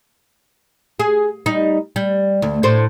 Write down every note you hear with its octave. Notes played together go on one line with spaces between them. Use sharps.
G#4
G3 D#4
G3
D2
A2 C5